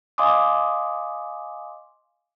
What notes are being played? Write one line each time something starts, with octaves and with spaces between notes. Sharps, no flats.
D#5 F5 G#5 C6 D6 D#6